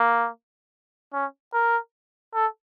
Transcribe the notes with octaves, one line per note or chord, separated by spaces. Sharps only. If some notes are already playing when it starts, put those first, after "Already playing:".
Already playing: A#3
C#4
A#4
A4